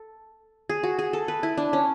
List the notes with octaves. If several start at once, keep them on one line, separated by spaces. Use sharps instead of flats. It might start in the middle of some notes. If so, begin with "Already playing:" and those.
Already playing: A4
G#4
F#4
G#4
A4
B4
E4
D4
C#4